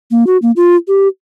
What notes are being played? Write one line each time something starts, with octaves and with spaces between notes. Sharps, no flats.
A#3
F#4
A#3
F4
G4